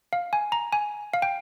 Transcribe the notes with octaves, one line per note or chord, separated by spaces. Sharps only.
F5
G#5
A#5
G#5
F5
G5